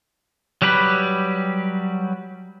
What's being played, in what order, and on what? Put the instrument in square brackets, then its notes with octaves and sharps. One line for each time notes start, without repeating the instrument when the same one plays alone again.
[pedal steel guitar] F#3 G3 G4 B4 B5